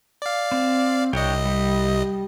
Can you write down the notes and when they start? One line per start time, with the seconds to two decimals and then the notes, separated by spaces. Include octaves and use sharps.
0.22 D5 F5
0.52 C4
1.13 C2 D4 C#5 D#5 G5
1.45 G3